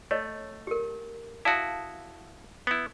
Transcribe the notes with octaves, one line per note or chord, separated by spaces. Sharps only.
A3 C#5 D#5
G4 A#4
E4 F#4 F5 A5 D#6
B3 E4